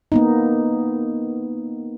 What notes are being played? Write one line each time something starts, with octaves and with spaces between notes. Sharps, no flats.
A#3 B3 D#4